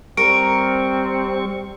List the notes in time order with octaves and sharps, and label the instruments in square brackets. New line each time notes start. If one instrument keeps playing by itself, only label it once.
[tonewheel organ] G3 C#6 [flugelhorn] C4 [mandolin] A#4 [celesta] D7